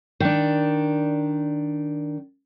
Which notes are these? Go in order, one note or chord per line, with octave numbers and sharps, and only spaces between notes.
D#3 D4